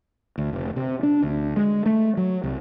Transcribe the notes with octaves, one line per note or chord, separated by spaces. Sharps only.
D2
F1
C3
D4
D2
G#3
A3
F#3
C2